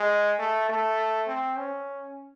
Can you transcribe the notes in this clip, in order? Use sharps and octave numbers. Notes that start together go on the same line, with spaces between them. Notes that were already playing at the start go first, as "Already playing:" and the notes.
Already playing: G#3
A3
A3
C4
C#4